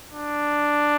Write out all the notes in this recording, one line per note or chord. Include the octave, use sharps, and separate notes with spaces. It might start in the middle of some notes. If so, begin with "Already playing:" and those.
D4